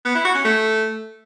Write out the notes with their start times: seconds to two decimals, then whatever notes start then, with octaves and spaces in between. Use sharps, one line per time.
0.05 B3
0.15 E4
0.25 F#4
0.35 C#4
0.45 A3